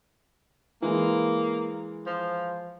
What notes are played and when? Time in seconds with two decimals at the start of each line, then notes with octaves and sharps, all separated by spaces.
0.82 E3 G#3 A#3
2.07 F3